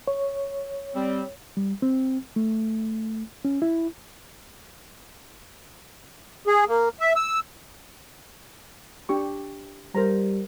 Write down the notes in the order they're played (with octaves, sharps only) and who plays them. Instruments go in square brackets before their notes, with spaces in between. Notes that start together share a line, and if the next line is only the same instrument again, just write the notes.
[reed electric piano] C#5
[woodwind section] G3 C4
[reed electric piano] G3
C4
A3
C#4
E4
[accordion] G#4
A#3
E5
E6
[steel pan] D4 G4 C#6
[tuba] G3 [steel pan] A#4 C5 A#5